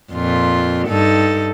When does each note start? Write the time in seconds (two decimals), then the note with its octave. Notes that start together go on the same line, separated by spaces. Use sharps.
0.12 F2 A#2 F4
0.88 G2 D#4 A4